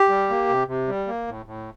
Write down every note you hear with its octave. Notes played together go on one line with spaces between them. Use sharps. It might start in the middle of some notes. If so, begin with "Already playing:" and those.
Already playing: G4
G3
A#3
C3
C3
G3
A#3
A2
A2